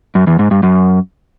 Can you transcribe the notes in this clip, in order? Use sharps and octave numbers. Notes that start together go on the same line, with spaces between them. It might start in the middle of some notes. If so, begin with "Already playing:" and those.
F#2
E2
G#2
G2
F#2